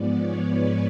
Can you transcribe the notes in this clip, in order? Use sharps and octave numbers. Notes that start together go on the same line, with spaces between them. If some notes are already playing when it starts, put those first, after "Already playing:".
Already playing: G#2 F3 G#3 B3 D5
C#5
B4